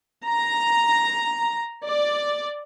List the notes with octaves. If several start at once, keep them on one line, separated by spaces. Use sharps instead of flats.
A#5
D5